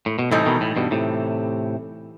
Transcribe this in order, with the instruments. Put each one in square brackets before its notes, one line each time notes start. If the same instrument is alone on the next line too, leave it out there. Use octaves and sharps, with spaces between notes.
[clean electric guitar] A2
B2
[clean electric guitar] A2 C3 [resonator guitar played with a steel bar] E3 G3 D#4 A4
[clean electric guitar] B2 D#3
A2
G2 B2
A2 C3